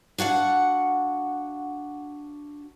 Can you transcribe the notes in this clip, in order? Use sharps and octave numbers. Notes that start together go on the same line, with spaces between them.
D4 F#4 F5 F#5